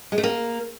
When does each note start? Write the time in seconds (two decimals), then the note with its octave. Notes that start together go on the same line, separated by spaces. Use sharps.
0.12 G#3
0.18 A3
0.23 A#3